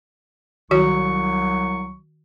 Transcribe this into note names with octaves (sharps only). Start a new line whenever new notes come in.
C2 D#3 F#3 F#4 C#5 C#6